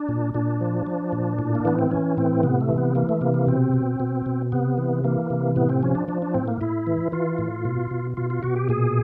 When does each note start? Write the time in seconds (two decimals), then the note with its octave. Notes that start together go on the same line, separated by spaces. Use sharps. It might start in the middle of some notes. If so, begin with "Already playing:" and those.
Already playing: D4
0.09 A#2
0.34 A#2 D4
0.61 F3
0.87 F3
1.12 A#2
1.39 A2
1.55 A#3
1.65 E3 B3
1.79 C4
1.91 E3 C#4
2.17 A2 C4
2.43 C3 B3
2.61 A3
2.69 E3
2.78 B3
2.95 E3 A#3
3.09 A3
3.21 C3 A#3
3.34 A#3
3.47 B2 C4
3.73 B2
4.00 B2
4.26 B2
4.52 C3 B3
4.78 E3
5.04 E3 A#3
5.30 C3
5.56 A2 B3
5.69 C4
5.83 F3 C#4
5.95 D4
6.08 F3 D4
6.22 D4
6.34 A2 C4
6.48 A#3
6.61 A2 E4
6.87 E3
7.12 E3 F4
7.38 A2
7.65 B2
7.91 B2
8.17 B2 F4
8.30 F4
8.43 B2 F#4
8.56 G4
8.69 A#2 G#4